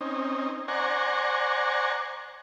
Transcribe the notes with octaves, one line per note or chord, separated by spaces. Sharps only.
C4 C#4 D#4
C5 D5 F#5 G#5 A#5 C#6